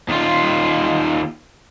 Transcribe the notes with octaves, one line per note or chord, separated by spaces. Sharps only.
D#2 F4